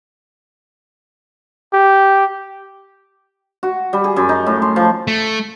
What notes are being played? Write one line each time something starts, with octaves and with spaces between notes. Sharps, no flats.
G4
F#4
G3
G#4
F#2
D#4
A2
C6
F3
A3